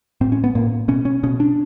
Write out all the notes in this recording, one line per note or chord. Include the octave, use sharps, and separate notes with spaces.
A2 C4
C#4
B3
A2 A#3
B2 C#4
C#4
B2 C#4
D4